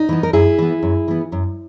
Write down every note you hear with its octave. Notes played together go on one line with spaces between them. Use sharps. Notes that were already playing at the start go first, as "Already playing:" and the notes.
Already playing: D#4
E3 B3
A#4
F#2 E4 G#4
E3 B3
F#2
E3 B3
F#2